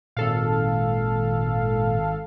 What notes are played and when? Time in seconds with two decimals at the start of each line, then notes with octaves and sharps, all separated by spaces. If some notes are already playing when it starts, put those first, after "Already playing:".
0.17 G#1 A#2 A4 F5